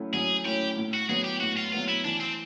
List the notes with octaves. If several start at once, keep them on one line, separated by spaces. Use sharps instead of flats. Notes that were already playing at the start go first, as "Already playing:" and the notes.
Already playing: F#3 A3 C#4 E4
F#3 G#4
A3 C#4 E4 G4
A2
F#4
F#3 B3 G#4
G4
A2 F#4
F4
F#3 B3 F4
E4
E3 D4
C4